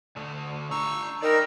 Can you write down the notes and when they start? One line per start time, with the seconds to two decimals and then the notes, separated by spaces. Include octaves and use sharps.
0.16 D3 A3
0.71 D4 A#5 C#6 E6
1.22 D#4 A#4 D5 G5 E6